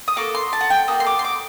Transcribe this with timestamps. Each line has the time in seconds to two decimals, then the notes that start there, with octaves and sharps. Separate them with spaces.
0.08 D#6
0.16 A#3 F#4 A4 D6
0.35 C6
0.53 A5
0.61 F#5
0.70 G5
0.88 A#3 F#4 A4 D#6
1.00 C6
1.07 D6
1.19 C6
1.25 D6